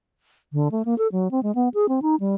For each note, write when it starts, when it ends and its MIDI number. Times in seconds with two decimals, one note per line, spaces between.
0.53 0.68 50
0.72 0.82 57
0.85 0.97 58
0.98 1.07 69
1.12 1.31 54
1.31 1.43 60
1.43 1.54 56
1.55 1.69 59
1.74 1.88 68
1.89 2.00 60
2.02 2.16 63
2.20 2.35 55